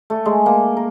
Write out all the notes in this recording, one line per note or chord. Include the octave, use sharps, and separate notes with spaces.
A3
G#3
A#3
A#4